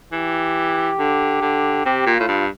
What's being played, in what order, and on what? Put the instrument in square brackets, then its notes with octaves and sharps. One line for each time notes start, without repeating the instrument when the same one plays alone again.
[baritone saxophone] E3 [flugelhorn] G4
[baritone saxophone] D3
D3
[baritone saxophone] C3 [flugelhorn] G4
[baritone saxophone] A#2
[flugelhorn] F4
[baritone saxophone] A2
G2